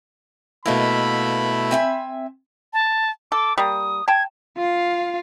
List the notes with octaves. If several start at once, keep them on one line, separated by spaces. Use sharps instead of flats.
B2 A3 A#3 D#4 E4 B4 B5
C4 E5 G#5
A5
A4 D6
G3 A#3 D#6
G5 A5 G#6
F4 F5